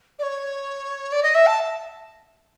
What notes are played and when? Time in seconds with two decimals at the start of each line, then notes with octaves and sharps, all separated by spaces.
0.19 D5
0.23 C#5
1.12 D5
1.23 D#5
1.34 E5
1.46 A5